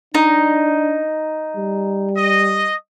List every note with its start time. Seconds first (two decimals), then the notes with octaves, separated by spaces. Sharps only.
0.15 D4 D#4
1.57 G3
2.17 D#5